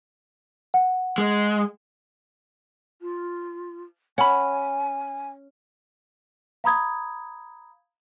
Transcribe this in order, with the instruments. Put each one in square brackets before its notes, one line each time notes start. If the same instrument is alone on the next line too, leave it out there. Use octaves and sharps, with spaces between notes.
[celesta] F#5
[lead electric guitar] G#3
[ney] F4
[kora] C#4 [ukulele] F#5 B5 [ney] G#5
[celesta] F5 A#5 B5 D#6 G#6